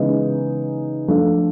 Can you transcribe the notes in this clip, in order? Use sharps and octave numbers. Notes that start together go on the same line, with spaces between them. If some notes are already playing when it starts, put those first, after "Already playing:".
Already playing: C#3 E3 G#3 B3 D#4
F3 A3 D4